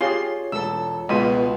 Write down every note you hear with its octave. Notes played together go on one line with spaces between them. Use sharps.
F4 G4 G#4 C#5 C6
E1 A4 E6
C#2 B2 G#3 F4 B5 C6 D#7